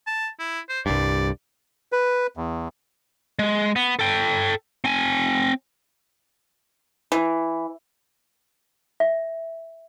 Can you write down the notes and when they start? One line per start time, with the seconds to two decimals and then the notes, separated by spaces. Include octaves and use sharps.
0.07 A5
0.39 E4
0.69 C5
0.86 C2 G2 D5
1.92 B4
2.37 E2
3.39 G#3
3.76 B3
3.99 A4 G5
4.84 C4 G#5
7.12 E3
9.00 E5